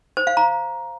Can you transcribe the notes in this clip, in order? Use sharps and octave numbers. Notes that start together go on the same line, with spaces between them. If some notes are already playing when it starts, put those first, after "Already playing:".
C5
F5
A#5